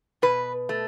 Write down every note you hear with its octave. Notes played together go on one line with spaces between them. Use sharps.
B2 B4
A3